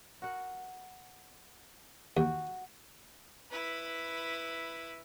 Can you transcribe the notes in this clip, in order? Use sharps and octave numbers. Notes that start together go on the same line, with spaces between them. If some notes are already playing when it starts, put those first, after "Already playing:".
F#4 A#4 F#5
D#2 F#4 G5
E4 B4